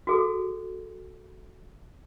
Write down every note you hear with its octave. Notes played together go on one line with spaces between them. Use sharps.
F#4 G#4 A4